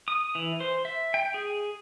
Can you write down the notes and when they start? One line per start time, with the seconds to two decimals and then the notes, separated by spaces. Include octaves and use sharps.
0.08 D#6
0.35 E3
0.60 C5
0.85 E5
1.14 G5
1.34 G#4